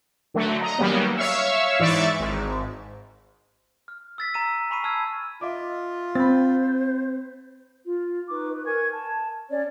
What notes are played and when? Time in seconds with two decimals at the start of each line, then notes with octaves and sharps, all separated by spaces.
0.34 D3 F#3 A3
0.61 D#5 A#5
0.78 D#3 F#3 G3 A#3 B3 C#4
1.16 C#5 E5 F5 C#6 E6
1.79 G#2 E3 D5 E5 C#6 A6
2.20 G#1 G#2
3.88 F6
4.18 E6 A6 B6
4.34 A#5 E6 D#7
4.70 G#5 B5 C#6 C7 D#7
4.84 A5 E6 F6 G#6
5.41 F4 D#5 E5 D6
6.15 C4 C5 B5 A6
7.85 F4
8.30 D#4 B4 C#6 D6
8.52 B4
8.65 A#4 G#5 C#6 G#6
8.91 A5
9.50 C#4 C#5 D5